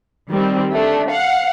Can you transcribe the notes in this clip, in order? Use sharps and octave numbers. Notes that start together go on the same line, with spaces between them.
D#3 G3 C4
A3 D4
F5 F#5